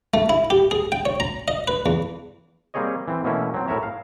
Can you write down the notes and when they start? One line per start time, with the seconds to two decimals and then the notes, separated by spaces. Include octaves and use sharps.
0.14 A3
0.29 E4
0.50 G4
0.71 G#4
0.92 G5
1.05 C#5
1.20 A#5
1.48 D#5
1.68 B4
1.86 E2
2.74 G3 A#3 C4 G#4 C#5 D#5
3.08 E3 C4
3.24 B2 E3 A3 A#3 C#4 E4
3.54 F#3 C4
3.68 A2 A#4 C#5 E5 A#5
3.83 F5